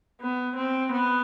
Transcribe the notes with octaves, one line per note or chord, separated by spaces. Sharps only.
B3
C4
B3